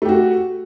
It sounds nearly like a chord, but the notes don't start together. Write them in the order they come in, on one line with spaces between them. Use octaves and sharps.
A3 G4 F#4